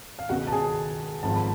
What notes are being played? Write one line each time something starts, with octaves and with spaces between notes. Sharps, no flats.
F5
C#2 B2 F#4 F#5
A5
G#4 G#5
G#1 G#2 F3 A5
B5